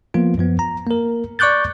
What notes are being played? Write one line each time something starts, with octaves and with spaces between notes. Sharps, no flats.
F3 A#3 B3 F4
F#2 F3 B3
A#5
A#3 A#4
D5 C#6 D6 F#6 G6 A6